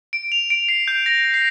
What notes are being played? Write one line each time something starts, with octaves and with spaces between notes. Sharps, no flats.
D7
F7
D7
C7
G6
A#6
C7